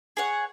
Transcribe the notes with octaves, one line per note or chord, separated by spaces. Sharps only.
G#4 C#5 F#5